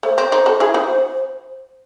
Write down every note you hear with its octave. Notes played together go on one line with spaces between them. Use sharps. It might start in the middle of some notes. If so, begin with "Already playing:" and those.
A3 C5
C4
C4 D#4 C5
F#4 A4
E4 G#4
D#4 F#4